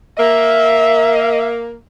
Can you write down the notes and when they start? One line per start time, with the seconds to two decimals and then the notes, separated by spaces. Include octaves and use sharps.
0.18 A#3 E5